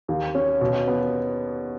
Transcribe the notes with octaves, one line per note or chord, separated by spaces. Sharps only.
D#2
C#4
B2
B3